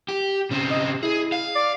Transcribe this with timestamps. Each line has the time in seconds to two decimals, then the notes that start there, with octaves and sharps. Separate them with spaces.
0.09 G4
0.51 C#3 C4
0.71 D#5
1.03 E4 G#4
1.32 F5
1.55 D5